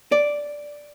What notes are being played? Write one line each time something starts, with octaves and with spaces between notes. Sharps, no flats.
D5